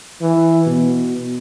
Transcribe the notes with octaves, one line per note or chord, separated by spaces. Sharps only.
E3
B2